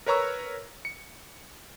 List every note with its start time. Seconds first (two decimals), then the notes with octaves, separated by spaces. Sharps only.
0.06 A#4 B4 C#5 A#5 C#6 E6
0.85 C#7